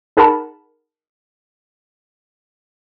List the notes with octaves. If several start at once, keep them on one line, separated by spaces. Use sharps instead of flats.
D#4 G#4 A#4 F#5 A5 B5